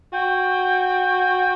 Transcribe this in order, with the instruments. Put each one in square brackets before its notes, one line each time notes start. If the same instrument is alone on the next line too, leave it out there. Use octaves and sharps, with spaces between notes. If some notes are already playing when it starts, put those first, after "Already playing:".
[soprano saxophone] F#4 [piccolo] G5